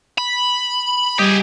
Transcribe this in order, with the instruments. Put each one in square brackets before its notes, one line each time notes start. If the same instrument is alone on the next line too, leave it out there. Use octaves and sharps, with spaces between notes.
[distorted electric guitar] B5
[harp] G3 D#5 [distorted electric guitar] G4 G#4